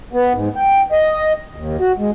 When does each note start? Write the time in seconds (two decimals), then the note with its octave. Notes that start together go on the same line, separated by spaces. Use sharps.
0.13 B3
0.34 G#2
0.56 G5
0.92 D#5
1.56 D#2
1.80 F#4
1.98 G#3